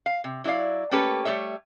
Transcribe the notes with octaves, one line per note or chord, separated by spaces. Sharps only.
F5
C3
F#3 E4 G4 D5 F5
A3 A#3 C#4 G4 A4 B4
G3 A3 A4 C#5 E5